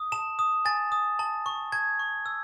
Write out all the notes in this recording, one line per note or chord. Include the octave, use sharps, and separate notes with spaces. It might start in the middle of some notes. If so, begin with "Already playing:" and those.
Already playing: D#6
A5 E7
D#6
G#5 A6
D#6
A5
C#6
A5 G#6
C#6
E6